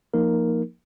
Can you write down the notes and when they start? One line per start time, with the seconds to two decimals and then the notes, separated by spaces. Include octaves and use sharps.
0.14 F3 A#3 D#4 A#4